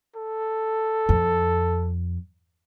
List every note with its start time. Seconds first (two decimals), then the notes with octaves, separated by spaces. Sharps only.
0.16 A4
1.09 F2